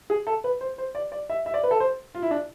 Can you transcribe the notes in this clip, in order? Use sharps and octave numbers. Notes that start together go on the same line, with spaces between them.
G#4
A4
B4
C5
C5
D5
D5
E5
E5
D5
B4
A4
C5
F4
E4
D4